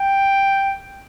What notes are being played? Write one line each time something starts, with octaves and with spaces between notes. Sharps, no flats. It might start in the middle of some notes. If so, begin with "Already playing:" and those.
Already playing: G5